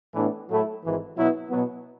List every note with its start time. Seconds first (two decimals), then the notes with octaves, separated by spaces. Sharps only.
0.14 A2 E3 B3 D4
0.49 A2 F#3 A3 E4
0.83 G#1 G#2 E3
1.16 B2 F#3 B3 E4
1.50 B2 F#3 B3